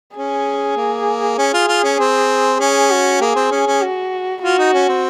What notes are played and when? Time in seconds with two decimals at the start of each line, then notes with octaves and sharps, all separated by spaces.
0.16 C#4 G#4
0.77 A#3
1.38 C#4 G#4
1.54 F4
1.68 F4
1.84 C#4
1.99 C4
2.59 C#4 G#4
2.91 F#4
3.21 A#3 G#4
3.36 C4
3.51 C#4
3.67 C#4
3.82 F#4
4.42 F4 F#4
4.58 D#4
4.74 C#4
4.89 C4